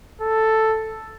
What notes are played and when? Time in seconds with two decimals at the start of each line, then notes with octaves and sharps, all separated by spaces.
0.21 A4